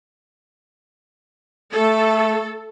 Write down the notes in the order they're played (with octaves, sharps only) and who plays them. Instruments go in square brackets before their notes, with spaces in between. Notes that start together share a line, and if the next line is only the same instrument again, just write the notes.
[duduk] A3 [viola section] A4